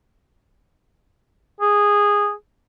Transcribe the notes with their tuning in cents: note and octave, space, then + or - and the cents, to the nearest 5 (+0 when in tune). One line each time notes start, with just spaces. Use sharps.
G#4 -15